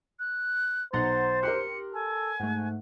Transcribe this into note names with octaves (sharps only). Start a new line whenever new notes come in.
F#6
B1 C5 F#5 A#5 C6 A6
G4 A#4 C6 F#6 C#7
A4 G#5
G#2 A3 F#5